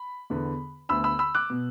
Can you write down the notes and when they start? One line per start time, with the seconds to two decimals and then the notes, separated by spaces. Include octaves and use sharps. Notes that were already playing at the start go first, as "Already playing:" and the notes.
Already playing: B5
0.30 E2 D3 B3
0.89 D2 D3 B3 B5 E6
1.04 B5 E6
1.19 B5 E6
1.35 D6 F#6
1.50 B2 B3